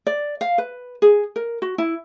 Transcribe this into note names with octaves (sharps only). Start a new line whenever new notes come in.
D5
F5
B4
G#4
A#4
F#4
E4